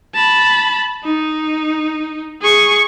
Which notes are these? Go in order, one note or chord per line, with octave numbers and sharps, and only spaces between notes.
A5 B5
D#4
G#4 C#6